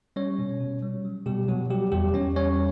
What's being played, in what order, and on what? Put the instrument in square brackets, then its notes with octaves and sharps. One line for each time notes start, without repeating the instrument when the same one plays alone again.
[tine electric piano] G3 C#4 C#5
B2
B2
G3
F#3
B2 G3 G4
B2 F#3 F#4
F#3 G3 G4
E2 G3 G4
E2 C#4 C#5
G3 C#4 C#5